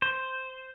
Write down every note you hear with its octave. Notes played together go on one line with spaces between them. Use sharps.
C5